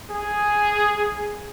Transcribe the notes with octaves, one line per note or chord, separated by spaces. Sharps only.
G#4